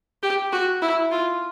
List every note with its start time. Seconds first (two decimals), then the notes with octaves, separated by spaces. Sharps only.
0.23 G4
0.53 F#4
0.82 E4
1.12 F4